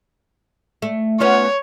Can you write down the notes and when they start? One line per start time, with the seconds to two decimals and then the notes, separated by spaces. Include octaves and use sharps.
0.82 A3
1.20 B3 C#4 F4 C#5